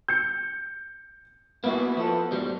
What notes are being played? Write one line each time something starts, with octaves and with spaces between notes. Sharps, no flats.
G6 C#7
A#3 B3 E4 F#4
F3 A4
G#2 F#3 G3